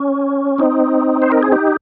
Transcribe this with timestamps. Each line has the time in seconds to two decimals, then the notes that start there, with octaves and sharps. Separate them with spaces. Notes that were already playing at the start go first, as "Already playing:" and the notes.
Already playing: C#4
0.58 C4 D#4
1.22 C5
1.32 A#4
1.43 G#4
1.52 D#4 G4